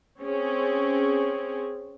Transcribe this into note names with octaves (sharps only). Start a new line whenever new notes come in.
C4 C#4 G#4